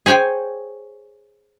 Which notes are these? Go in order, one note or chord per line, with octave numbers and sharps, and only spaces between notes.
G#4 C5 C#5 G5 G#5